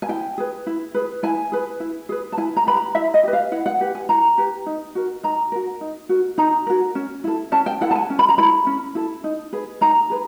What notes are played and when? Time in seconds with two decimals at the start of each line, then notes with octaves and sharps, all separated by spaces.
0.02 G#5
0.09 E4 G5
0.38 G#4 B4
0.67 E4
0.94 G#4 B4
1.23 E4 G#5
1.52 G#4 B4
1.80 E4
2.09 G#4 B4
2.32 A5
2.37 E4 G#5
2.56 A#5
2.66 G4 B4 B5
2.76 A#5
2.95 E4 E5
3.14 D#5
3.23 G4 B4
3.33 F5
3.52 E4 F#5
3.66 F#5
3.81 G4 B4
3.95 G#5
4.09 E4 A#5
4.38 G4 B4
4.66 D#4
4.95 F#4 A#4
5.23 D#4 A#5
5.52 F#4 A#4
5.81 D#4
6.09 F#4 A#4
6.38 D#4 A#5
6.67 F#4 A#4
6.95 C#4
7.24 E4 A4
7.52 C#4 A5
7.66 G5
7.81 E4 A4 F#5
7.91 A5
7.95 G#5
8.10 C#4
8.19 B5
8.29 A#5
8.38 E4 A4 B5
8.67 C#4
8.95 E4 A4
9.24 D#4
9.53 G#4 B4
9.81 D#4 A#5
10.10 G#4 B4